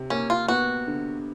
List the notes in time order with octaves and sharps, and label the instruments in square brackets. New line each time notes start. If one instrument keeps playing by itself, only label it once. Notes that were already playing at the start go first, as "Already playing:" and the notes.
Already playing: [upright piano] C3
[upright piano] A#3 [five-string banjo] C#4
[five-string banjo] F4
[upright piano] B3 [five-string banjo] F#4
[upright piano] D3